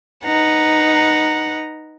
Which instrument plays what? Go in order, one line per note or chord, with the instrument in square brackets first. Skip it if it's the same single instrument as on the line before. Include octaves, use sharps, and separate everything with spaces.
[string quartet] D#4 B4 F#5 A#5